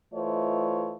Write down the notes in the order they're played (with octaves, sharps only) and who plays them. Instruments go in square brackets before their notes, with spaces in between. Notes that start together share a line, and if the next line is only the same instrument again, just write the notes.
[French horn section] E3 A3 F4 C5 C#5 D#5